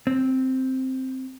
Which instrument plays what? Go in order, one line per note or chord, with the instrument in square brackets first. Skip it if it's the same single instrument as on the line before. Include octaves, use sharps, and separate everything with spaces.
[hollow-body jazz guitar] C4